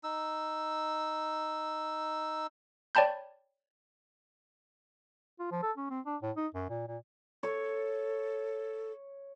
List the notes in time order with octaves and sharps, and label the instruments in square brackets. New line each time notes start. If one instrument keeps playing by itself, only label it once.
[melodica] D#4 E6
[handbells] C#5 D5 G5 A5 B5 G6
[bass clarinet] F4
F3
A4
C#4
C4
D4
A2
D#4
F#2
A#2
A#2
[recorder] A4 [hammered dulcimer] C#5